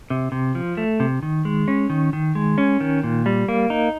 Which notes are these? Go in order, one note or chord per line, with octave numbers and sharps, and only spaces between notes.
C3
C3
F3
A3
C3
D#3
G#3
C#4
D#3
D#3
G#3
C#4
D#3
A#2
G3
A#3
D#4